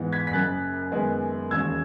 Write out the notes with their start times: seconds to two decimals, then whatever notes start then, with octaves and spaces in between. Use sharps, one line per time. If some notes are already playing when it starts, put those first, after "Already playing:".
Already playing: G#2 E3 G#3 B3
0.12 G#6 B6
0.27 B6
0.33 F#1 F#2 C#3 F#6 A6
0.91 F#1 F#2 D#3 G#3 B3
1.51 E1 D#2 C#3 G#3 E6 G#6